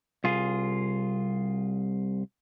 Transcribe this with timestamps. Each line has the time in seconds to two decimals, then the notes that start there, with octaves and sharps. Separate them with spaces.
0.24 C2 F4 G#4